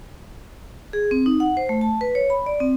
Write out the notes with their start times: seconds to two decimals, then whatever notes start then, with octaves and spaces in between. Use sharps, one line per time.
0.93 G#4
1.11 C4
1.26 D#4
1.40 F#5
1.57 C5
1.69 A3
1.81 A5
2.01 B4
2.15 C#5
2.30 B5
2.46 D5
2.60 C4